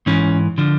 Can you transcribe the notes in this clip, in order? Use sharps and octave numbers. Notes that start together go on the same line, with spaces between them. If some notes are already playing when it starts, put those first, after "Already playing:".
G#2 E3 C#4
D3 F3